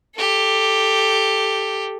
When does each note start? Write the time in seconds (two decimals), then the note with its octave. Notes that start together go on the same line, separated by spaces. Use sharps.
0.16 G4 A4